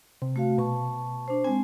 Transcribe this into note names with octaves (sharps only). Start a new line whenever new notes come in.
C3
A3 F#4 F5
B2 A5 C#6
D4 C5
G#3 C4 G#5